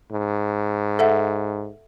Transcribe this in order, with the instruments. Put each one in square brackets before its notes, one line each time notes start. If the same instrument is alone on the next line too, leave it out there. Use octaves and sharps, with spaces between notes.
[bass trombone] G#2
[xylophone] A4 E5 F#5